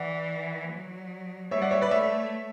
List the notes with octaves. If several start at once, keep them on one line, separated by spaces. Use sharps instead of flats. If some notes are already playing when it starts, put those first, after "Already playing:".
Already playing: E3 D5 F#5
F#3
G3 C#5 E5
D5 F#5
C#5 E5
B4 D5
A3 C#5 E5